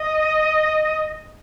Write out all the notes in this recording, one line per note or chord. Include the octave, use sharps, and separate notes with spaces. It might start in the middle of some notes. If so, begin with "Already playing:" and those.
Already playing: D#5